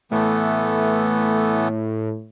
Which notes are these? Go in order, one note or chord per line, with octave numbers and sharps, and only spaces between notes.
A2 E3 A3 B3